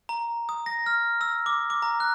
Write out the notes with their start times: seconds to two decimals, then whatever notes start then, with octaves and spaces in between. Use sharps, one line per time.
0.09 A#5
0.49 D#6
0.66 A#6
0.86 F6
1.21 E6
1.46 D6
1.70 D6
1.82 A#5
2.00 F#6